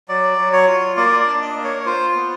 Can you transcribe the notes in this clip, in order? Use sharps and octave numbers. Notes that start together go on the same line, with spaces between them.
F#3 D5
F#3
C#5
F4
A#3 D5
D5
D4
D#5
A#3
C#5
C#5
F4 C5
B3